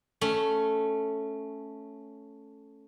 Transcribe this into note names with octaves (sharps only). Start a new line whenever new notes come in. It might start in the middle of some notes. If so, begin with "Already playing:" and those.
A3 C#4